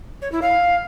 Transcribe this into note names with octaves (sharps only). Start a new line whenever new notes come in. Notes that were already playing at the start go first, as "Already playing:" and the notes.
C#5
E4
F5